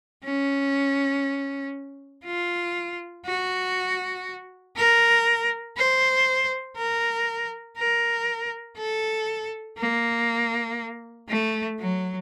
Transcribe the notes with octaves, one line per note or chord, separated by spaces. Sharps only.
C#4
F4
F#4
A#4
C5
A#4
A#4
A4
A#3
A3
F#3